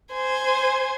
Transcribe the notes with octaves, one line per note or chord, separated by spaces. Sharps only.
C5 G#5